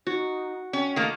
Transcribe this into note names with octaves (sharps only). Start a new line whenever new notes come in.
D#4 F#4
C#4 G5
D#3 A3 A#3